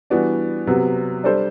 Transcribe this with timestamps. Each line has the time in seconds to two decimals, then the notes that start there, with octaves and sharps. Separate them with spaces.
0.10 E3 G3 B3 D4 F#4
0.67 C3 F#3 B3
1.24 G3 D4 A4 C5